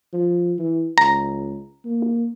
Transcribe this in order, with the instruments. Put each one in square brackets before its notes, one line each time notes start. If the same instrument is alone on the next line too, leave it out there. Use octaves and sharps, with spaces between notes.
[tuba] F3
E3
[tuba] C#2 [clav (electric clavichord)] A#5
[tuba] A#3